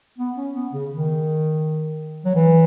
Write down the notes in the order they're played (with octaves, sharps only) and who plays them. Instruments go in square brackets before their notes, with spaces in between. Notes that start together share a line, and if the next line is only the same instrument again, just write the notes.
[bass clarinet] B3
C#4
B3
C#3
D#3
F#3
E3